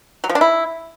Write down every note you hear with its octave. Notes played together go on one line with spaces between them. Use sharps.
F#3
F3
D4
E4